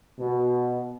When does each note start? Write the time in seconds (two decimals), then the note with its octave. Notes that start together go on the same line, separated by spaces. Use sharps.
0.19 B2